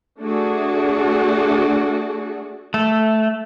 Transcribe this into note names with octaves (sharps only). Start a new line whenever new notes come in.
A3 D4 F#4 G#4
A3